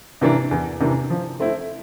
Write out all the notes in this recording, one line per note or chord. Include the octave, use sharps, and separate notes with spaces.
C3 E3 A#3 D4
E2
C3 E3 A#3 D4
F3
A3 C4 E4